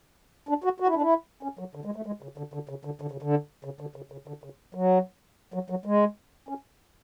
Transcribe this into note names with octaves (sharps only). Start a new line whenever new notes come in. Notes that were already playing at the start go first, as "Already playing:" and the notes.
D4
F#4
F#4
E4
D4
E4
C#4
F#3
D3
G#3
A3
G#3
C#3
D3
D3
C#3
D3
D3
C#3
D3
C#3
D3
C#3
C#3
D3
C#3
F#3
F#3
F#3
G#3
C#4